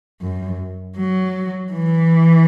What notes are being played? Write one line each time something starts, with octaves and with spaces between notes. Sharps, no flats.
F#2
F#3
E3